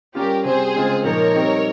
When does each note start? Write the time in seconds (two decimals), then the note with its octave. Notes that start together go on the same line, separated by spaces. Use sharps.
0.15 G3 C#4 F4 G4 A#4
0.44 C3 G3 C4 G#4 C5
0.75 C#3 G#3 C4 F4
1.04 A#2 F3 A#3 D#4 A#4 C#5
1.34 G3 C4 D#4